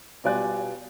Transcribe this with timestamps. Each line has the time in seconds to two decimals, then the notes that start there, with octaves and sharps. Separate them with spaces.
0.24 B2 G3 F4 D5 G#5 F#6